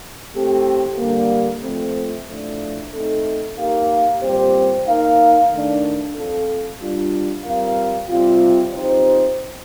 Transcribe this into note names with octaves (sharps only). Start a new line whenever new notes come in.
A2 A3 C4 G4
D3 G3 A#3
F3 A3 C4
A2 F3 A3 D4
A3 C4 D#4 A4
A#3 D#4 G4 A#4 F5
A#2 G3 C4 G4 C5
A#3 D#4 A#4 F5
D#3 A3 D4
F3 C4 F4 A4
G3 D4 F4
G3 C4 F4 A#4 F5
C3 G3 C4 F4
F3 C4 D#4 G4 C5